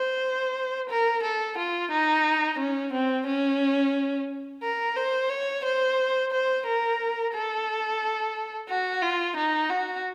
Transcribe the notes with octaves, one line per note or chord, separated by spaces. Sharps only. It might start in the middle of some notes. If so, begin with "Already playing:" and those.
Already playing: C5
A#4
A4
F4
D#4
C#4
C4
C#4
A#4
C5
C#5
C5
C5
A#4
A4
F#4
F4
D#4
F#4